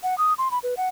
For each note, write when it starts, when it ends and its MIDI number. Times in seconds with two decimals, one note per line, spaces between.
0.03 0.17 78
0.18 0.34 87
0.38 0.51 84
0.51 0.59 83
0.63 0.75 71
0.77 0.89 78